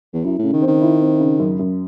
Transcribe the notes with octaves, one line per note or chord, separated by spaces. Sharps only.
E2
F#2 E4
A2 C#3
D#3
C4
D#3
E4
C4
C#3
F#2
F#2